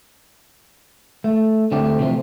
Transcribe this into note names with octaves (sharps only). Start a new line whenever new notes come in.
A3
D3 A3 C4 G4
C3 E3 F3 A3 C4